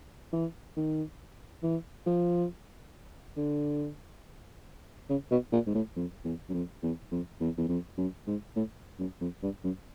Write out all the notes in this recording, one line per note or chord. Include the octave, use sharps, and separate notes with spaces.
E3
D#3
E3
F3
D3
C#3
B2
A#2
G#2
A2
F2
E2
F#2
F2
E2
F2
E2
E2
F2
F#2
G#2
A2
F#2
F2
G2
F#2